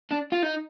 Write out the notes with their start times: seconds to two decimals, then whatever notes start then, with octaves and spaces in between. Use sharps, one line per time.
0.11 D4
0.32 F4
0.43 D#4